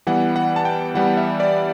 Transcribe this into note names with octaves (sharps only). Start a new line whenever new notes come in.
E3 G3 B3 F#5
F#5
A5
G5
E3 G3 B3 F#5
E5
D5